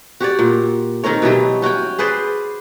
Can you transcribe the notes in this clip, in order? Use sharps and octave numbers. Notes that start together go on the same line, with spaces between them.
F#4 G4 C#5 D5
A#2
D#3 C4 A#4 C#5
B2 E3 F#3 G3
C#4 F#4 C#5 G5
G#4 B4 C5 D5